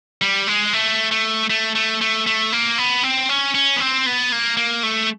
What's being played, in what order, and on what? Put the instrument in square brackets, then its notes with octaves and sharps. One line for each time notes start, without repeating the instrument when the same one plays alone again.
[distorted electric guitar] G3
G#3
A3
A3
A3
A3
A3
A3
A#3
B3
C4
C#4
C#4
B3
C4
B3
A#3
A#3
A3